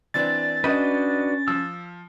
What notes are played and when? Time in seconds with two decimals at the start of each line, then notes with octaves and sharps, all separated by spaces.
0.14 E3 C4 D4 D5 A6
0.64 C#4 D4 F#4 B4 D#5 G6 D#7
1.48 F3 E6